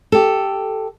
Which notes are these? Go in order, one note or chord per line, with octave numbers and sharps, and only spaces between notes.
G4 A4